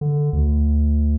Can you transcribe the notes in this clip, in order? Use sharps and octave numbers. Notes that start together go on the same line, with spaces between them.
D3
D2